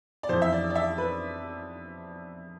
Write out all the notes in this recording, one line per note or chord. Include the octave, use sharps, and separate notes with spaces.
D5
F2 E3 C5
E5
D5
D5
E5
B4